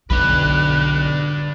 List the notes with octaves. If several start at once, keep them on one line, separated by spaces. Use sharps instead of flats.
B1 F2 D3 D4 B4 F#6